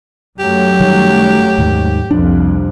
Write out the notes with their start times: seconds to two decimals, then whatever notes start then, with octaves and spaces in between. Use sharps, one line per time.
0.39 F#2 F#3 A3 G4
0.80 D#3 G3
1.58 D#2 G#2 D#3
2.11 C2 F2 D4